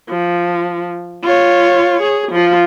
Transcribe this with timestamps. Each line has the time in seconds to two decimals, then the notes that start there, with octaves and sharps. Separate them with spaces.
0.10 F3
1.24 F4 C#5
2.02 G#4
2.32 F3 F4